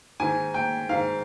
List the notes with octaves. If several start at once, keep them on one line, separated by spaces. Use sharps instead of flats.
G#2 D#3 G#5
G5
G#2 D#3 F5